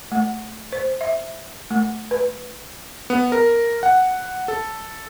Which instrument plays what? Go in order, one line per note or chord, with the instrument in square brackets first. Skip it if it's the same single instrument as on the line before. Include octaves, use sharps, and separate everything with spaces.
[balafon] A3
C5
E5
A3
B4
[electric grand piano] B3
A#4
F#5
A4